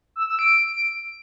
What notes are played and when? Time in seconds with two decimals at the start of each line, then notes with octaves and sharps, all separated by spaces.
0.16 E6
0.27 E6
0.39 D7